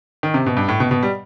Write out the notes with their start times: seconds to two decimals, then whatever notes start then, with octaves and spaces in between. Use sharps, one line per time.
0.23 D#3
0.34 C3
0.46 B2
0.57 G2
0.69 A2
0.80 B2
0.91 B2
1.03 G3